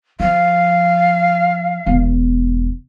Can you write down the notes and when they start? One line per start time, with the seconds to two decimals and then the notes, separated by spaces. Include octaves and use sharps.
0.20 F3 F5
1.86 E1 E2